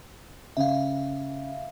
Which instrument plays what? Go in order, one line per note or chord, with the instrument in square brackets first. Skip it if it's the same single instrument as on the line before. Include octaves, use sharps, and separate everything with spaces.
[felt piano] C#3 [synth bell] E5 F5